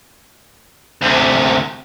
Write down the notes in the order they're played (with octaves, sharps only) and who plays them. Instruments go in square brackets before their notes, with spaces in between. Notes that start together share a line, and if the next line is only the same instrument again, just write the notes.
[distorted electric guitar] D2 C3